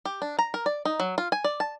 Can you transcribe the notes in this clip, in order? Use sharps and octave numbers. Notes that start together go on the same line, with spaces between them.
G4
D4
A#5
A#4
D5
D#4
F#3
F4
G#5
D5
A5